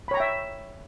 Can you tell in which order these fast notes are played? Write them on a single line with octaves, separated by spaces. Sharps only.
B5 C#5 A#5 G5 E5